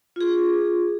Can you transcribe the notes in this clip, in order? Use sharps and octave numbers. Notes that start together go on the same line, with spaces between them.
F4 G#4